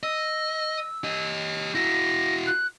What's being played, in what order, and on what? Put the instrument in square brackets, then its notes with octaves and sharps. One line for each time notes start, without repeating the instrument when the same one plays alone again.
[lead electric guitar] D#5 [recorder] E6
[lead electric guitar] G4 D#5
[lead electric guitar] E4 F#4 [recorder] A#6
[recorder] F#6